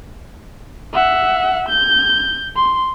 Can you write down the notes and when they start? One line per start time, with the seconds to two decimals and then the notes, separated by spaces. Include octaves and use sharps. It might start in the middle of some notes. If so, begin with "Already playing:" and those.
0.94 E5 F#5
1.69 G6
2.56 C6